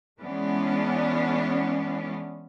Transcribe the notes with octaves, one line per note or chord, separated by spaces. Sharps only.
E3 G#3 B3 C#4 D4